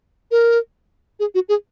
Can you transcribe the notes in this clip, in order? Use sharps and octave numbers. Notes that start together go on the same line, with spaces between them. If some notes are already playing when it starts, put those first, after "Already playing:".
A#4
G#4
F#4
G#4